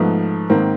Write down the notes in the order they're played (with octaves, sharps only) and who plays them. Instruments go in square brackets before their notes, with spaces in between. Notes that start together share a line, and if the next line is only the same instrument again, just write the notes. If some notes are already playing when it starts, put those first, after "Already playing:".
Already playing: [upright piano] G#2 F3 A3 B3
G#2 D#3 A#3 C4